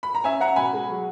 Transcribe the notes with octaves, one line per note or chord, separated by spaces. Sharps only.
B5
A#5
C#4 E5 G#5
C#4 F#5 A#5
B2 G#5 B5
G#3
F#3